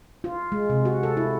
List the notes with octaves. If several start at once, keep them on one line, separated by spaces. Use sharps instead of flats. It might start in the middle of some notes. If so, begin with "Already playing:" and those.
F4
G#3
C3
F#4
A4
E4